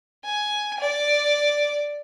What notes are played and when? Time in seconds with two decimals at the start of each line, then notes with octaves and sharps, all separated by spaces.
0.24 G#5
0.80 D5